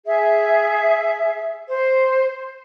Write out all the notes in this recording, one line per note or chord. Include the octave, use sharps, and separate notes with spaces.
G#4 E5
C5